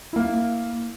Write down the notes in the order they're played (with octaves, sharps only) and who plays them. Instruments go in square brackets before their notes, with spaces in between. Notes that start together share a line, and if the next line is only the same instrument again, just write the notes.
[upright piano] A#3 E4